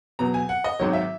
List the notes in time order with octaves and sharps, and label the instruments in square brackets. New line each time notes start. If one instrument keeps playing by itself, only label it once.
[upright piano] E2 B2 F#3 A#5
G#5
F#5
D#5
G#1 G#2 D#3 F#3 C#5
E5